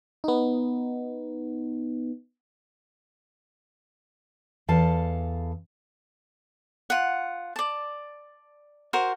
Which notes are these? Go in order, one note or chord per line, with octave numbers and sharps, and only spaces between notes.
B3 D#4
E2 A4 F5 A5
F4 F#5
D5 A5
F#4 A#4 C5